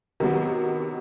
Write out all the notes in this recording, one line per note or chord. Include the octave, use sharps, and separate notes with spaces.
C3 D#3 F#3 B3